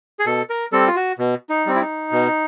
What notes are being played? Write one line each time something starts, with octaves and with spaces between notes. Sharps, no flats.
G#4
B2 A4
A#4
G3 C4 A4
F4
F#4
B2
D#4
G3 C4
E4
D#4
B2